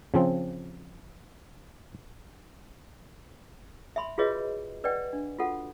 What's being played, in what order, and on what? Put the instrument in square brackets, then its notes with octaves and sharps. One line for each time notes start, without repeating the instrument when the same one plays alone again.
[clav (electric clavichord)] C#3 F3 C4
[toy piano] E5 G#5 B5 C6
F4 F#4 G#4 B4 C#5 D#5
B4 D5 D#5 F#5 G5
D4
F4 F#4 A4 F#5